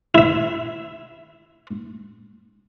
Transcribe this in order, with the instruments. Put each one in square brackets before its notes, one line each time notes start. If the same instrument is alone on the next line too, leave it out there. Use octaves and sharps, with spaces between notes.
[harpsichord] E4 E5